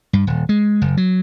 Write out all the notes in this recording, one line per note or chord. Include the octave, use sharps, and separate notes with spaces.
G2
D#1
G#3
F#1
F#3